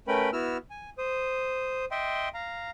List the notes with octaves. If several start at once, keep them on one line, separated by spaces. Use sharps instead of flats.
A3 C#4 A#4 B4 G5 B5
B3 E4 F#4 E6 F6
G#5
C5 D#6
D#5 E5 G5 C6
F5 A#5